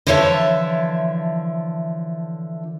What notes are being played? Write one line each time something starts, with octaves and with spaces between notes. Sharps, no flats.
D3 E3 F3 C#5 E5 A5